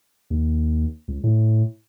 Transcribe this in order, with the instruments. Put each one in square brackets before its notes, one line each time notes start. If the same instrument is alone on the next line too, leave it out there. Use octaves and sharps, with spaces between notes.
[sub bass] D#2
C#2
A2